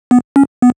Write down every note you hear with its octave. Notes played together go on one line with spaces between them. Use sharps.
B3
C#4
B3